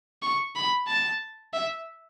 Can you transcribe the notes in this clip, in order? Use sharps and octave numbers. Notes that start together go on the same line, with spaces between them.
C#6
B5
A5
E5